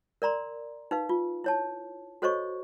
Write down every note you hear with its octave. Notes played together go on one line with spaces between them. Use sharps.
A#4 D5 A#5 C6
D#4 B4 F5
F4
E4 C#5 A5
F#4 A4 C5 C#5 D#5 C#6